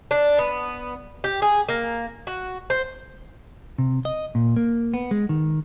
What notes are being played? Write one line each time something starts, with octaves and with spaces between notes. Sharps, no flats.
D4
B3
G4
G#4
A#3
F#4
C5
C3
D#5
A#2
A#3
B3
G#3
D#3